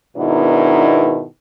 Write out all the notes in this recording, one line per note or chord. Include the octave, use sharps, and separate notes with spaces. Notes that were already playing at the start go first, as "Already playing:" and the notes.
G#2 B2 D#3 B3 D4 E4